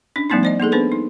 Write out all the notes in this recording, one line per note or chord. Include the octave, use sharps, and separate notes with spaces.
C#4 D4
F3 G3 A3 B3 C#4 D#4
C5 D5 D#5
A#3 D#4 G#4 A4
B3 D4 G#4 B4 C5
D#4